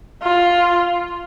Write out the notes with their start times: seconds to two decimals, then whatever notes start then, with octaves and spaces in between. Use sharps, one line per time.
0.23 F4